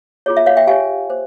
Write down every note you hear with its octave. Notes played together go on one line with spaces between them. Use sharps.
F4 G#4 C#5
E5
C#5 F5
E5 G5
G4 C#5 F5 G#5
C5